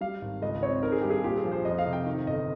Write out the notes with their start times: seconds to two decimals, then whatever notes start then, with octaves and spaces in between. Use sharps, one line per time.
0.01 G3 F5
0.22 G#1
0.42 C#2 D#5
0.62 C4 C#5
0.83 D#3 A#4
0.92 G#4
1.02 G2 G4
1.11 G#4
1.24 A#2 G4
1.38 G#4
1.44 F3
1.52 C5
1.65 F2 D#5
1.79 F5
1.86 C3
1.93 G5
2.06 D#3
2.27 G1 D#5